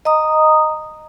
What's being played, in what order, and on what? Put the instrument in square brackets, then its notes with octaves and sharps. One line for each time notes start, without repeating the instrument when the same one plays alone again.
[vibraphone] D#5 A#5 D#6